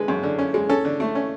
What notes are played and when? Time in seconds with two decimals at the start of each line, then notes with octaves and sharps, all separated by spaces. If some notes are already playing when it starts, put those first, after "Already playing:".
Already playing: D3 G#3 B4
0.08 F#2
0.23 D3
0.39 C#4
0.54 G#3
0.69 C#4 A4
0.85 D3
1.00 A3
1.15 C#4